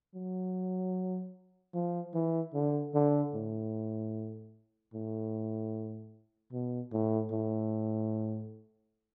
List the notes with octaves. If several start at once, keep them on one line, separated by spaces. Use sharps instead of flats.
F#3
F3
E3
D3
D3
A2
A2
B2
A2
A2